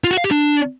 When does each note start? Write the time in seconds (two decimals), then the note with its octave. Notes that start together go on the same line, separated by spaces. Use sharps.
0.04 F4
0.11 F#4
0.17 F5
0.24 G4
0.31 D4